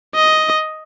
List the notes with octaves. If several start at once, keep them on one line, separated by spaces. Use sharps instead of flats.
D#5